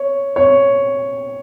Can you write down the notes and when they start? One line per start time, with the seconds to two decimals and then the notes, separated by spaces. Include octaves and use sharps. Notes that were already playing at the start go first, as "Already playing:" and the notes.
Already playing: C#5
0.36 C#5